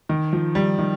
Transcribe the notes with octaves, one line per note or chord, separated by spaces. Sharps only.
D#3
F3
G3
D#3